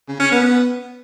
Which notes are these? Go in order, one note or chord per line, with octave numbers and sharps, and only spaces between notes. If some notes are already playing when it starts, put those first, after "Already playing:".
C#3
C#4
B3